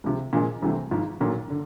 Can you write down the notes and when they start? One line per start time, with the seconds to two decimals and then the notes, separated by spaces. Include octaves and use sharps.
0.04 C#2 C3 F3
0.33 A#2 F3 G#3
0.62 C2 C3 E3 A3 C4
0.91 G#1 G#2 F3
1.20 B1 A#2 F#3
1.50 D3